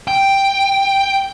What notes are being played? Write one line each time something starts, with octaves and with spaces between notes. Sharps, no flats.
G5